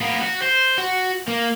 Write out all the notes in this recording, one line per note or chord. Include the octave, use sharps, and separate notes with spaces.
A#3 B3
F#4
C5
F#4
A#3